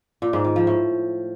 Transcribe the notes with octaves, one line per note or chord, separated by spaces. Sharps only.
A#2
G#2
D#3
F3
A2